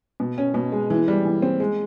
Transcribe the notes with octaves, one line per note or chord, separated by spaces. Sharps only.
B2
C#4
B2
G#3
E3
G3
E3
C4
G#3